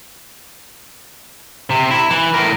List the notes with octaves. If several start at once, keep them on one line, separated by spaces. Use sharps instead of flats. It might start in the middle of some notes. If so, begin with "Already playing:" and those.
C3
E4
E3
A2 A#4